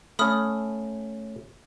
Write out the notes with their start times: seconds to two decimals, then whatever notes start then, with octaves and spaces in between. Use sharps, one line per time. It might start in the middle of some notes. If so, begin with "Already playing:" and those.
0.19 A3 C#4 B5 D#6 F6